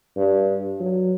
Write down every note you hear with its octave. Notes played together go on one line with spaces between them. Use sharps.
G2
F#3